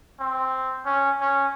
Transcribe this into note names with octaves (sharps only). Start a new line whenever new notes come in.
C4
C#4
C#4